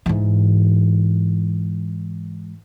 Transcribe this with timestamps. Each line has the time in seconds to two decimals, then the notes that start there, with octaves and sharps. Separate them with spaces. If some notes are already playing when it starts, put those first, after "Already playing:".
0.06 G#2 E3